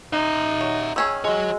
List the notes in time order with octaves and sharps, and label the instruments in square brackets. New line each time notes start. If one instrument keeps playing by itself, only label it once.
[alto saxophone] D#4 [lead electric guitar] E5 A#5
[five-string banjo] F#3
[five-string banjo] D#3 C#4 G#4 [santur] E6
[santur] G#3 [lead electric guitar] F#4 C#5